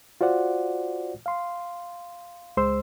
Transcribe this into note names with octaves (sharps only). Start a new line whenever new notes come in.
F4 F#4 C5 D5 F#5
F5 C6
C#2 G#3 C5 C6 E6